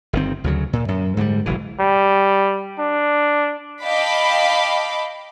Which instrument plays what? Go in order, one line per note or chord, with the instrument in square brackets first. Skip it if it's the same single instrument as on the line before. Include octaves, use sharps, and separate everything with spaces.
[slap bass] G1 D#3 C4
D2 C#3 F#3
A#2
F#2
G#2 D3 F#3 G3
F#1 B1 E3
[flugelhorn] G3
D4
[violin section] D#5 F5 G5 A5 B5 D6